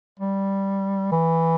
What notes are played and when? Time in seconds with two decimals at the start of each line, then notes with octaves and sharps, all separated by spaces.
0.20 G3
1.12 E3